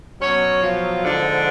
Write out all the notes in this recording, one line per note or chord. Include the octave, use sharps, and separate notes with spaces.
B2 F#3 C#4 C#5
F3 F4
G#2 D3 F3 D4